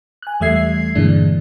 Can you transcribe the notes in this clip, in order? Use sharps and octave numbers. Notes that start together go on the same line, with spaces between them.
G#5 F#6
E2 G3 A3 E5 G#6 C7
G2 A#2 D3 E3 G#3 D4